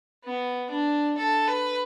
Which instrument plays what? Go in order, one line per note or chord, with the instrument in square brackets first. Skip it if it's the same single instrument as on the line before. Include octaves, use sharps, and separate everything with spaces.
[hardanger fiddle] B3
D4
A4
B4